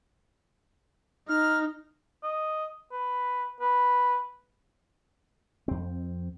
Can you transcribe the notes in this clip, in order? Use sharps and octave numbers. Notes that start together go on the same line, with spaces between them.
D#4 F6
D#5
B4
B4
F2 C4